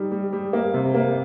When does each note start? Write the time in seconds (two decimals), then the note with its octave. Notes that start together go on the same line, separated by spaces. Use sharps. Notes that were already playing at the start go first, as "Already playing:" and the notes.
Already playing: G3 D#4
0.12 G3
0.33 G3
0.53 A#3
0.74 C3
0.94 A#3